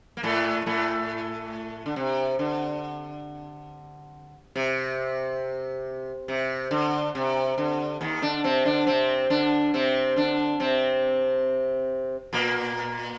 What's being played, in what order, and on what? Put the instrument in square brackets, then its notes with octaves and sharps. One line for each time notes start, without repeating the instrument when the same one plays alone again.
[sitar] A#3
A2 A3
A2 A3
D3
C3
D3
C3
C3
D3
C3
D3
D#2 D#3
D3 D4
C3 C4
D3 D4
C3 C4
D3 D4
C3 C4
D3 D4
C3 C4
A#2 A#3